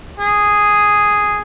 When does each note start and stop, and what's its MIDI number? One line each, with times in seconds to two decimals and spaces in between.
0.19 1.42 68